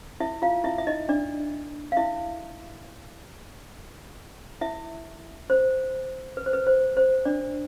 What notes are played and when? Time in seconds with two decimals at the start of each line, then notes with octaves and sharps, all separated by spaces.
0.20 E4 E5
0.42 F4 F5
0.64 E4 E5
0.78 E5
0.87 D#4 D#5
1.09 D4 D5
1.92 F5
1.97 E4 E5
4.61 E4 E5
5.50 C5
6.37 B4
6.46 C5
6.53 B4
6.67 C5
6.97 C5
7.25 D4 D5